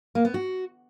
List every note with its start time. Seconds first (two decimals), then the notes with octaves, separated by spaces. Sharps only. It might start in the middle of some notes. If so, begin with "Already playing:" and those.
0.15 A#3
0.25 B3
0.34 F#4